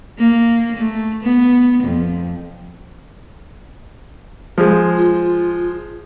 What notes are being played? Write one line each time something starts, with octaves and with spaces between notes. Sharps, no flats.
A#3
A3
B3
F2
F3 G#3
F4